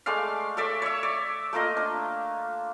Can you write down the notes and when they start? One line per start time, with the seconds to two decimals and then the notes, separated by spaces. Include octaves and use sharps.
0.06 G#3 A3 D5 F5
0.57 A4 C#5 D5 E5
0.82 C#5 E5
1.03 D5
1.53 A3 A#3 F4 D#5
1.77 D4